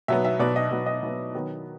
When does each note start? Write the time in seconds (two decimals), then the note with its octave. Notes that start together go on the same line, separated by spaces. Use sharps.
0.08 B2 F#3 B3 E5
0.25 E5
0.39 B2 F#3 B3 D5
0.56 D#5
0.71 B2 F#3 B3
0.86 D#5
1.03 B2 F#3 B3
1.35 D#3 F#3 B3